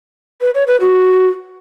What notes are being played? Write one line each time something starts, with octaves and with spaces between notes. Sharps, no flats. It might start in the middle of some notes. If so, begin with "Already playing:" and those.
B4
C#5
B4
F#4